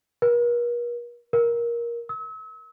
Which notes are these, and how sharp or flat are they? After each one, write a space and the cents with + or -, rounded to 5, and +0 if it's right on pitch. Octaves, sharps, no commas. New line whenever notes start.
A#4 +45
A#4 +15
E6 -40